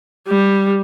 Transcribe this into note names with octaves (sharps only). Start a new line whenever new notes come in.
G3